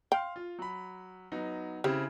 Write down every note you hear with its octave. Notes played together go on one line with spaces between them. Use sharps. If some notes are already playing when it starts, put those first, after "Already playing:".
F5 G5 C6 F6
F4
F#3 B5
F#3 B3 D#4
C#3 C4 E4 G4